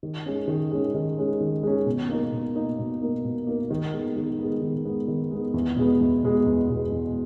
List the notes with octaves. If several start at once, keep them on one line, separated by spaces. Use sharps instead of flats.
D#3
G#3 C#4
D#3
G#3 C#4
D#3
G#3 C#4
D#3
G#3 C#4
B2
A#3 D#4 A#4
B2
A#3 D#4 A#4
B2
A#3 D#4 A#4
B2
A#3 D#4 A#4
D#3
G#3 B3
D#3
G#3 B3
D#3
G#3 B3
D#3
G#3 B3
E2
B2 G#3 B3
E2
B2 G#3 B3
E2
B2 G#3 B3
E2